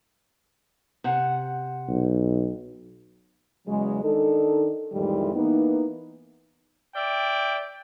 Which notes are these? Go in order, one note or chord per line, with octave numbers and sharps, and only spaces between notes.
C3 F#5
B1
E2 C#3 F#3 G#3
D#3 D4 D#4 A4
F2 A2 D#3 E3 G3 G#3
E3 A#3 B3 D#4
D5 E5 G5